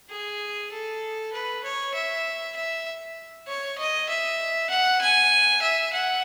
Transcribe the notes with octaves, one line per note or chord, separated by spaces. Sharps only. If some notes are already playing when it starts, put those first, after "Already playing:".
G#4
A4
B4
C#5
E5
E5
C#5
D#5
E5
F#5
G#5
E5
F#5